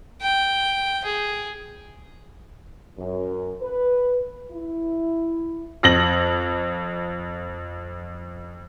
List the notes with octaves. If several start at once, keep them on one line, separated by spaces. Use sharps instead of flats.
G5
G#4
F#2
B4
E4
F2 A#6 F#7